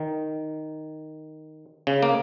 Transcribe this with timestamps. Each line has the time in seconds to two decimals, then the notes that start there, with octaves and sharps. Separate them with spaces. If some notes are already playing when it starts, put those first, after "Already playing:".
Already playing: D#3
1.87 C#3
2.03 A#3